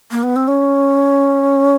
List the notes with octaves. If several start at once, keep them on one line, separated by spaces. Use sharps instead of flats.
A#3
B3
C4
C#4